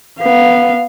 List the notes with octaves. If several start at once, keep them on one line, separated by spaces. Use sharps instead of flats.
B3 F5